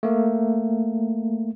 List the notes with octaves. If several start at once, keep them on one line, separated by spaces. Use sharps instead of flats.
A3 A#3